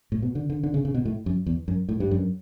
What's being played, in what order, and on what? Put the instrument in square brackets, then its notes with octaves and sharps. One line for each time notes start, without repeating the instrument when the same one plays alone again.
[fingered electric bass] A2
B2
D3
D3
D3
C#3
C#3
B2
A2
F#2
E2
F#2
A2
G2
F#2